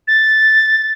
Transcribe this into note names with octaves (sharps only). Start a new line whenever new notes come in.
A6